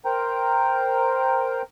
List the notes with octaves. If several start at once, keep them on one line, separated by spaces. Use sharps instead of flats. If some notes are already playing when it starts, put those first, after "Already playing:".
A#4 C5 G5 A#5